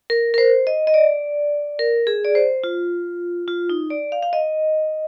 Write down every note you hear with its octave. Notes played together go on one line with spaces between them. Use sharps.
A#4
A#4
C5
D#5
D#5
D5
A#4
G#4
D5
C5
F4
F4
D#4
D5
F5
F5
D#5